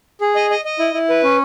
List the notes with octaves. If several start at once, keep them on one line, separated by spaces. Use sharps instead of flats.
G#4
D#5
D#5
D#5
E4
E4
B4
C#4